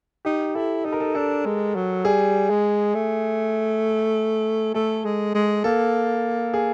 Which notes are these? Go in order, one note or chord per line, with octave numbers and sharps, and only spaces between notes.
D#4 G4
E4 A4
D#4 A4
A#4
A4
D4 A4
G#3
F#3
G3 G#4
G#3
A3
A3 A4
G#3
G#3
A#3 A4
G#4